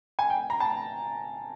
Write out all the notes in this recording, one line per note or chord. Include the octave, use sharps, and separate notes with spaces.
G#5
G5
A#5
A5